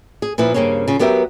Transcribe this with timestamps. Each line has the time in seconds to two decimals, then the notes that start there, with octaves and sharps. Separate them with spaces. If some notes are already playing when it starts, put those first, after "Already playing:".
0.22 G#4
0.38 A#2 F3 E4 B4
0.54 G2 C#3 A#3 C4 C#4
0.88 C#3 F4
0.99 F#3 B3 G4 A#4 E5